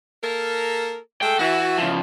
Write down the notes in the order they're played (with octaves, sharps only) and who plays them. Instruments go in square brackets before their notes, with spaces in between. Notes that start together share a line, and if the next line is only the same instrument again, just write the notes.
[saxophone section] A#3 A4 A#4
[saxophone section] G#3 A3 A4 [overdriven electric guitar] G5
[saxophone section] E3 E4 [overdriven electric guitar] F#4
[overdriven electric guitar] C#3 F3